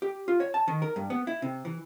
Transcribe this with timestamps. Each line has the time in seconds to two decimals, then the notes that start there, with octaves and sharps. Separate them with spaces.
0.02 G4
0.28 F4
0.40 C#5
0.54 A5
0.68 D#3
0.82 A#4
0.96 G2
1.10 B3
1.27 E4
1.42 C3
1.65 E3